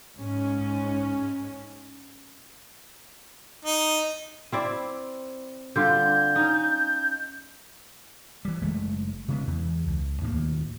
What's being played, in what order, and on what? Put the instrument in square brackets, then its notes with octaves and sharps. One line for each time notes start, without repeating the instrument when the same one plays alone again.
[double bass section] G#2 C#4
[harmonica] D#4
[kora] C4 E4 D5
[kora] D3 G3 F4 [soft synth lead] G6
[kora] C#4 D#4
[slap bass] E3 G3
F#1 G#3 A3
C#3 G#3 B3
E2 E3
C#2
D#2 A2 D#3 A#3